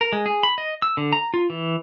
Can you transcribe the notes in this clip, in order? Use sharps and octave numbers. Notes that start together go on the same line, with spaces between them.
A#4
G#3
G#4
B5
D#5
E6
D3
A#5
F4
E3